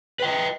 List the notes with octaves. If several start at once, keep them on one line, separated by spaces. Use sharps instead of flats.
B4 D#5 G5